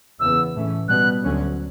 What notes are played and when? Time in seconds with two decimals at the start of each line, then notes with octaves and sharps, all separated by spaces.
0.20 E2 C#3 E3 B3 E6
0.53 A2 E3 A3 C#4
0.88 B2 G3 B3 F#6
1.24 D2 D3 F#3 C#4